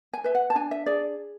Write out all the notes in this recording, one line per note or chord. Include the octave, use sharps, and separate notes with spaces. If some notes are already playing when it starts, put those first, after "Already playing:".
G#5
B4 E5
F#5
A5
D4 G#5
E5
G#4 D5